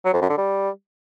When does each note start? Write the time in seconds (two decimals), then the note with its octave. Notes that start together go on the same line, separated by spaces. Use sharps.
0.05 F#3
0.13 F2
0.21 F#2
0.30 D3
0.38 G3